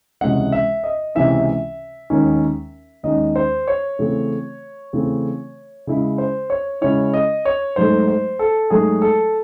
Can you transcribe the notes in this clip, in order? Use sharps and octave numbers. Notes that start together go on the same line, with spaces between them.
C#2 C3 E3 G#3 C#4 F#5
E5
D#5
C#2 C3 E3 G#3 C#4 E5
D#2 D#3 G#3 C#4
D#2 D#3 G#3 C#4 D#5
C5
C#5
C#3 E3 A3 C4
C#3 E3 A3 C4
C#3 G#3 C#4 E4
C5
C#5
C#3 G#3 C#4 E4 C#5
D#5
C#5
G#2 F#3 A3 C5
C5
A4
G#2 F#3 A3 G#4
A4